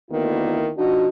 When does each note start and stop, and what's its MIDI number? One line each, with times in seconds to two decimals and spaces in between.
0.11 0.70 38
0.11 0.70 51
0.11 0.70 58
0.11 0.70 59
0.11 0.70 64
0.77 1.08 53
0.77 1.08 62
0.77 1.08 63
0.77 1.08 66